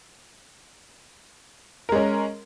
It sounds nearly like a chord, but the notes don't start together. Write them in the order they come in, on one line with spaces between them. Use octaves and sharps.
A#4 G#3 C#4